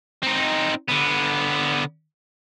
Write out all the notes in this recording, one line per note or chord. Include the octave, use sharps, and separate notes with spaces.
C4 D#4
D3 B3